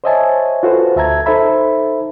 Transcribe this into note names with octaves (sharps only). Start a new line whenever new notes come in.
C5 C#5 D#5 E5 G#5 A5
F4 F#4 A4 B4 C5
D2 E5 A5 A#5 G#6
D#4 A4 C5 E5 B5